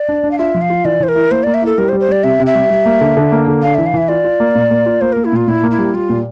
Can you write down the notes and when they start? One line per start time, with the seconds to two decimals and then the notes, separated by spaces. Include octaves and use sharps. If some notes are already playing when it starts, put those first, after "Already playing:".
Already playing: D5
0.09 D4
0.24 D4
0.31 F5
0.38 F4 E5
0.55 F3
0.61 F5
0.70 F4
0.85 E3 D5
1.00 E3 C5
1.08 A#4
1.15 E4
1.31 A#3 C5
1.43 A#3 D5
1.54 E5
1.62 E4 A4
1.78 G3 A#4
1.89 C5
1.93 G3
2.00 C5
2.09 G3 D5
2.23 C3 E5
2.40 C3
2.46 E5
2.55 G3
2.70 G3
2.86 A#3
3.01 D3
3.17 D3
3.32 A#3
3.47 D3
3.62 D4 F5
3.75 E3 E5
3.86 F5
3.94 E3 E5
4.08 F4 D5
4.24 F4
4.40 A#3
4.55 A#2
4.71 A#3
4.86 F4
5.01 A#3 C5
5.12 A#3 A#4
5.25 E4
5.32 A#2 F4
5.48 A#2 E4
5.63 A#3
5.71 E4
5.78 G3
5.94 G3 F4
6.09 A#2